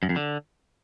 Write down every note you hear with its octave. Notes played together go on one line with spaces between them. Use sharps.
F#2
F2
D3